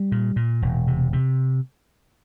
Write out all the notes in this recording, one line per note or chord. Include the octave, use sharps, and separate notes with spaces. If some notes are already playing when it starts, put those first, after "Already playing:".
Already playing: G3
A#2
A#2
E1
C3
C3